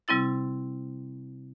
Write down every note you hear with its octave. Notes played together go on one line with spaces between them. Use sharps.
C3 G3 C4 E4 A6